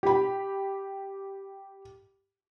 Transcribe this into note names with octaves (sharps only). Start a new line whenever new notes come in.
G4 B5